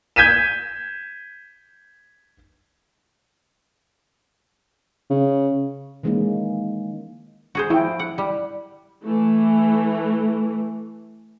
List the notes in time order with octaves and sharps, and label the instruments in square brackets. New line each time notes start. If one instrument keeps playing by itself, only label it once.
[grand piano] G6 G#6 B6 D#7 E7
[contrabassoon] C#3
[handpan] D#3 E3 G#3 A#3 C#4 D#4
[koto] F#4 G#4 C5
[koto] F3 [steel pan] E4 G5
[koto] F#5
G3
[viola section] E3 A3